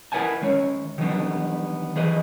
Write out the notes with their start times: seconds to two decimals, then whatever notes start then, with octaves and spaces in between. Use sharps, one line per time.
0.12 E4 A#4 B4 F#5 G#5 A5
0.41 D#3 G#3 C#4 C#5
0.98 D#3 E3 F#3 G3 B3 D4
1.96 E3 F3 G#4 B4 C5 D#5